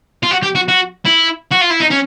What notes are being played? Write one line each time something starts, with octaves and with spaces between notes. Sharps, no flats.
F4
F#4
G4
F#4
F#4
E4
F#4
F4
E4
D#4
C#4